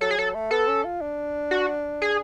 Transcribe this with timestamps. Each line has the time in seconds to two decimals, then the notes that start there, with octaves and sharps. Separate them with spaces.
0.01 F#3 A4
0.11 G#4
0.18 F#3 A4
0.35 A3
0.51 B3 A4
0.68 C#4
0.85 F4
1.01 D4
1.51 F#4
2.02 G#4